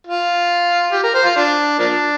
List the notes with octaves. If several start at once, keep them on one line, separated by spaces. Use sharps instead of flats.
F4
G4
A#4
C5
F4
D4
F3 A#3 D4